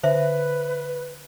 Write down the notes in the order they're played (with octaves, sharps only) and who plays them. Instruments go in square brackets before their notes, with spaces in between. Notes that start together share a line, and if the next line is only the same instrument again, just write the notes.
[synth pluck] D3 [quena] B4 [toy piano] C5 E5